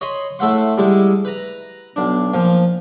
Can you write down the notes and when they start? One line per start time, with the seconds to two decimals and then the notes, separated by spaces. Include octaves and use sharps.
0.01 C#5 D#5 B5 C6
0.39 A2 A3 E5 F#5 C6
0.77 G3 G#3 E4
1.25 B4 A#5
1.96 B1 D4
2.34 A#2 F3